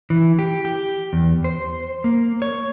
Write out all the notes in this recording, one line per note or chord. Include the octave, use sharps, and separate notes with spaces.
E3
G4
G4
E2
C5
A#3
C#5